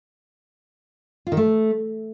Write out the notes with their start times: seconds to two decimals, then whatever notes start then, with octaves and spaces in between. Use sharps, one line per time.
1.27 F4
1.32 D#3
1.37 A3